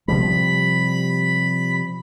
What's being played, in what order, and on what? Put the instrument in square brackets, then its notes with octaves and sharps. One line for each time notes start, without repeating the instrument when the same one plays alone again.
[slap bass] C3 F3 G3 [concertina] B5